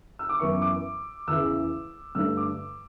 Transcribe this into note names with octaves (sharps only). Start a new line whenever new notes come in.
E6
D6
F#2 E3 B3 E4 C#6
D6
E2 C#3 E3 E6
G2 D3 A3 D4 E6
D6